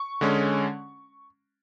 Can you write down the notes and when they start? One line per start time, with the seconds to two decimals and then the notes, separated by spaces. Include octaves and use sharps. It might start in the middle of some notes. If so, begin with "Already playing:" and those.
Already playing: C#6
0.21 D3 G#3 C#4